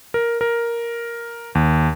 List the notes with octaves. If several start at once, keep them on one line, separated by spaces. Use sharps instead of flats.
A#4
A#4
D#2